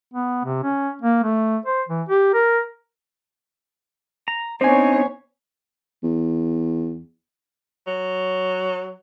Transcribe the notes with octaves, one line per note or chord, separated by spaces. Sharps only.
B3
C3
C#4
A#3
A3
C5
E3
G4
A#4
A#5
B3 C4 D4 D#4 C5 C#5 G#5
E2
F#3